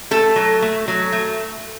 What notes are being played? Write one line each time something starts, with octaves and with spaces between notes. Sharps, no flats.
A3 A4
F#3
A3
F#3
A3